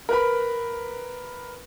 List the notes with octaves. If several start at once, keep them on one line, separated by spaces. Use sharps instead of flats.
A#4 B4 B5